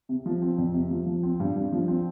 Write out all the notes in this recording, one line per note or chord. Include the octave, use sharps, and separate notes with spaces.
C3
F3
C4
F2
C3
F3
F3
C4
G2
G2
F3
C4